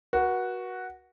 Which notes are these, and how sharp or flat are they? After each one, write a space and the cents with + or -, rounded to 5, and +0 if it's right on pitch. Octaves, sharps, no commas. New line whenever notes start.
F#4 +0 B4 -45